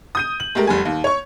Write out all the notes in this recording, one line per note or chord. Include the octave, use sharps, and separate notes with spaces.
D#6 G6 D#7
F#7
G#3 A3 G4 A#4
F1 G3 G#5
D#2
C#5 C#6